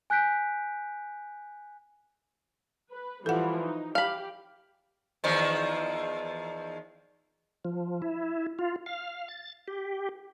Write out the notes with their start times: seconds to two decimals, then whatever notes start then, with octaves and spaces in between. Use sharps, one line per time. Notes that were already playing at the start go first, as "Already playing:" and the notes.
0.10 G#5 F#6 G6 B6 D7
2.90 B4
3.26 E3 F3 G3 A4 F#5
3.61 D#4
3.95 G4 F5 B5
5.24 E2 D#3 F3
7.65 F3
8.02 E4
8.59 F4
8.86 F5
9.28 A6
9.68 G4